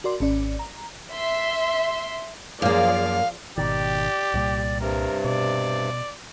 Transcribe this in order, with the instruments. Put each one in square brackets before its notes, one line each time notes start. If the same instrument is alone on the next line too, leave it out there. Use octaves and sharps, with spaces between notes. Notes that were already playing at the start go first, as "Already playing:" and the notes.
[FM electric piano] F#4 A#4 D5 C6
G#1 C#4 D5
A#5
[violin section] E5 C6
[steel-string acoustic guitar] F#2 A#3 [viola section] F3 G#4 D5 [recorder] F5
[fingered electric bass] G#1 B2 D#3 [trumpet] G4 [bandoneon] D5
[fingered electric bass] C2 A#2 G3
[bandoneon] G2 C3 [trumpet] A#4
[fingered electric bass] B2 [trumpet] D5